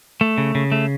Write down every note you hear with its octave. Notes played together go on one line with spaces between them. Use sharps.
A3
C#3
C#3
A3